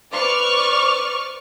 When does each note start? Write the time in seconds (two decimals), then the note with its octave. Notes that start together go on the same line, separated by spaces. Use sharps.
0.13 B4 C5 D5 C#6 D6 F6